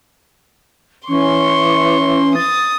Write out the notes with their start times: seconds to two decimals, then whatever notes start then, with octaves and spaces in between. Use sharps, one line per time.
1.08 E3 C#4 C6 C#6
2.36 D#6 A6